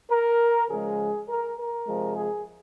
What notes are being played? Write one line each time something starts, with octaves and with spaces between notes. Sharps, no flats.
A#4
C#3 F3 G#3 G#4
A#4
A#4
C3 F3 G#3
G#4